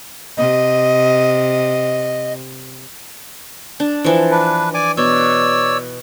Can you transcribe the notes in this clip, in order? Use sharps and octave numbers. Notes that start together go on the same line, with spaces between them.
C3 D#5
D4
E3 F3
D4 B4
D5 G#5 D6
B2 C#5 D5 E6